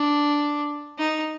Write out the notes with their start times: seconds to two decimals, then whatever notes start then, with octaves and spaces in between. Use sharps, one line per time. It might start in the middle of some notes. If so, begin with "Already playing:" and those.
Already playing: D4
0.99 D#4